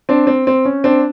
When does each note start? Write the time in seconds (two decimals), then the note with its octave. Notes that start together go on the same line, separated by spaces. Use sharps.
0.09 C4 D4
0.27 C4
0.47 C4
0.65 C#4
0.84 C4 D4